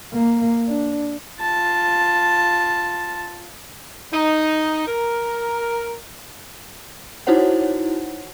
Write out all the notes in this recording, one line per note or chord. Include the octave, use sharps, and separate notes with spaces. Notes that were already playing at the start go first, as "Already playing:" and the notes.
A#3
D4
F4 A5
D#4
A#4
D#4 E4 F#4 C5 C#5 F#5